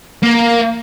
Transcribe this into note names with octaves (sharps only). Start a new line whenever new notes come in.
A#3